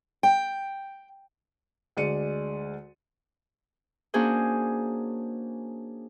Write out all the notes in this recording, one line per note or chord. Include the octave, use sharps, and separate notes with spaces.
G5
D2 G#3 D5 C#7 D#7
A#3 C#4 D4 F#4 G#4 C5